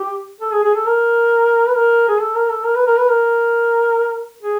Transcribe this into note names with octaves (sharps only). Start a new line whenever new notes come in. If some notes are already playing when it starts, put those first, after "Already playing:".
Already playing: G4
A4
G#4
G#4
A4
A#4
B4
A#4
G#4
A4
A#4
A4
A#4
B4
A#4
B4
A#4
G#4